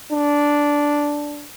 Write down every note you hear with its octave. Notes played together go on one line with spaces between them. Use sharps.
D4